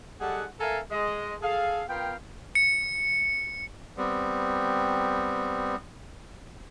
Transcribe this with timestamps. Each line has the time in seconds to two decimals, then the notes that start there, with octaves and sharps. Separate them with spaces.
0.21 G3 G#4 A4 D#5 F#5
0.60 A4 A#4 E5 F5 G#5 A5
0.91 G#3 D#5
1.42 G#4 A4 F5
1.89 B3 F4 A#4 F5 G5
2.55 C#7
3.97 G3 B3 C4